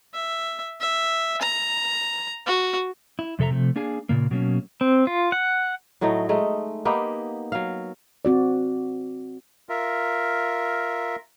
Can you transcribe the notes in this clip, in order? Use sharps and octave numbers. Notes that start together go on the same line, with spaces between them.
E5
E5
A#5
F#4
E4
F2 C3 A4 E5 A#5
C3 F3 A3
A#3 D4 G#4 F5 G#5
A#2 C#3 A#3
B2 F#3 A#3 C#4
C4
F4
F#5
A2 F#3 A3 D#4
G#3 A3 D#4
A#3 B3 D#4 G4
F#3 F5
C4 F#4 D5
F4 A#4 E5